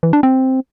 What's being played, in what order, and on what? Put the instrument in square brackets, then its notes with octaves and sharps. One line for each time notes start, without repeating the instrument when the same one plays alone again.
[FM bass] E3
D4
C4